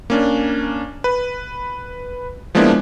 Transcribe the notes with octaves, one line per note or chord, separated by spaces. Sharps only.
A#3 C#4 D4
B4
F3 G#3 A#3 B3 D4 E4